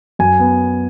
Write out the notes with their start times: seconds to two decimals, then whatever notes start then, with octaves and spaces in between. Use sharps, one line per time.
0.19 F#2 G#5
0.40 B3